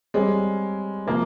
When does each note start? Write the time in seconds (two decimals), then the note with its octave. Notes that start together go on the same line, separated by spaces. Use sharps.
0.14 G3 G#3 C4 G4 C#5
1.07 C3 F3 G#3 A#3 C4